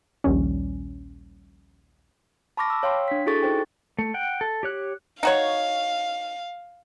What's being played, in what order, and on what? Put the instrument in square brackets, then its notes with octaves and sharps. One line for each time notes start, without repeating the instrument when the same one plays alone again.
[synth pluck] A#1 D#2 G3 C#4
[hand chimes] A5 B5 C#6 D6 F6 A#6
E6
C#5 F5 G5 C6
D4 B6
E4 F#4 G#4 A4 C#6 A6
D#4 C5 G5
[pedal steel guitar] A3
F#5 G5
A4
G4 C#5 F#6
[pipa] D#4 F#4 C#5 [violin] F5